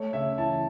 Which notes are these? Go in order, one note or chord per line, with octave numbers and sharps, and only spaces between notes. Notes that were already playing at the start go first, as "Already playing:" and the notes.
Already playing: A3 C#5
C#3 E5
E3 A5